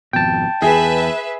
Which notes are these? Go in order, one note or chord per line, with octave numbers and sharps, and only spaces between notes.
G#1 F2 B2 G5 A5
E2 G#4 B4 E5